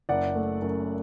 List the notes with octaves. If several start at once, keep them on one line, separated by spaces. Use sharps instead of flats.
F#1 D5 F#5
A3
F#2